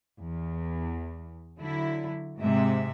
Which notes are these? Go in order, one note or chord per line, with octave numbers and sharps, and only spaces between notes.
E2
D3 F#3 E4
G#2 C3 G#3 E5